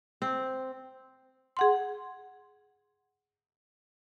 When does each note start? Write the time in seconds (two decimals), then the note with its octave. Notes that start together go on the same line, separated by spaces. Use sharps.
0.22 C4
1.57 G#4 F#5 C6